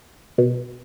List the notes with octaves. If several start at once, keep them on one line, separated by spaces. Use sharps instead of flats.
B2